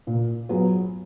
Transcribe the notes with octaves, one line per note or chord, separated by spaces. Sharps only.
A#2
F#3 B3 F4 G#4